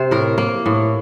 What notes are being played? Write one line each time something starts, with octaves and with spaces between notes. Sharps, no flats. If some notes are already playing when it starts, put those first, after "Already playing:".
Already playing: C3 C5
A2 A#4
A#3
A2